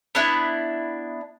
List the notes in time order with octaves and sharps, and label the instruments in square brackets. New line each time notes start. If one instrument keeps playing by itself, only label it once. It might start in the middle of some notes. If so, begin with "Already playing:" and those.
[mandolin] B3 D4 E4